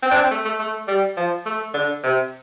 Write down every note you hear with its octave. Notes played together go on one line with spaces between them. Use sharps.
C4
D4
C4
A3
A3
A3
G3
F3
A3
D3
C3